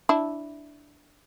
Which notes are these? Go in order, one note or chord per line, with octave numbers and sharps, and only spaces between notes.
D4 E4